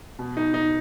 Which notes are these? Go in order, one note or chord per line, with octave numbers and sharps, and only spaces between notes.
B2
D#4
D#4